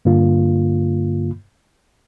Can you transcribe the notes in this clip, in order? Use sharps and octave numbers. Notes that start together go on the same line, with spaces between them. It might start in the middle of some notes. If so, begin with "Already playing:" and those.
G2 D3 A#3 F4